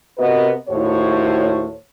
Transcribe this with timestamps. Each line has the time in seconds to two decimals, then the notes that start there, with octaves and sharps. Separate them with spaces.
0.17 C3 B3 F#4 A#4 B4 D#5
0.68 D#2 A2 F#4 C5 C#5